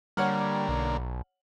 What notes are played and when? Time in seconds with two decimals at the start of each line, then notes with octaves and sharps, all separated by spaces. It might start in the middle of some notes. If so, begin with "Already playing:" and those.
0.17 D3 G3 A#3 C#5 F#5 F6
0.69 B1